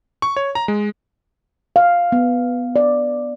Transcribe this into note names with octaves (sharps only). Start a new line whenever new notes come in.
C#6
C#5
A#5
G#3
F5
B3
D5